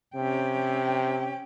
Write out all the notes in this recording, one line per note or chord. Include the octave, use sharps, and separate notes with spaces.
C3 C#4 G5